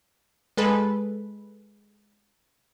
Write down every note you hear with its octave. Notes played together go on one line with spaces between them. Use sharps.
G#3 A4 B4